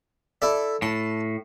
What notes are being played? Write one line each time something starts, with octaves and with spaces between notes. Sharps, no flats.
E4 A4 D5
A2 A5